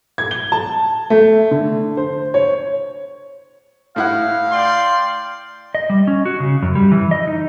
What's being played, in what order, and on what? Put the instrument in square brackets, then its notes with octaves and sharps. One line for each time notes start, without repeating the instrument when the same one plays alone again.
[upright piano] G#6
G7
A5
A3
D3
C5
C#5
[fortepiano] A2 E4 F#5 [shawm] F5
[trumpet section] D5 G5 C6
[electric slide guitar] D#5
G3
C#4
F#4
C#3
F#2
G3
E3
D#5
D#4